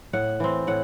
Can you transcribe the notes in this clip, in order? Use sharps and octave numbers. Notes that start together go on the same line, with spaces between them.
A2 F#5
E3 C4
A2 F#5